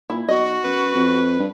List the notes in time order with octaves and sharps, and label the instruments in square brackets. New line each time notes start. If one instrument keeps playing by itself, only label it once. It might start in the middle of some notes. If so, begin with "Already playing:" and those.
[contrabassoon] A#2 [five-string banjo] E4
[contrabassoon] B1 [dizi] F#4 [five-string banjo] D#5
[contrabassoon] F#2 [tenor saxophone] B4
[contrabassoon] F2
G2